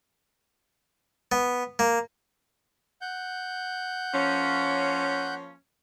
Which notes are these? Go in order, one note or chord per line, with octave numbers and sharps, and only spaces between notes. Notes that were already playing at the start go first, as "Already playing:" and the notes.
B3
A#3
F#5 G6
F3 A#3 C#4